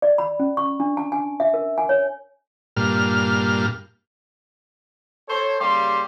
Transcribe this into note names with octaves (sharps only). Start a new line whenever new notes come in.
D5
B5
C#4
C#6
D4
A5
G#5
E5
A#4
G#5
C#5
G2 A#2 F6
A4 C5 C#5
C#3 G3 A#3 G4 C6